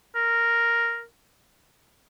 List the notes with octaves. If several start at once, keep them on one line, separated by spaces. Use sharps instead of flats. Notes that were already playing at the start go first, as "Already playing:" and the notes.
A#4